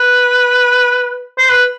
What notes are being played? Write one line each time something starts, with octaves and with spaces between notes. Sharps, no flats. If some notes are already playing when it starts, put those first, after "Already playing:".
Already playing: B4
C5
B4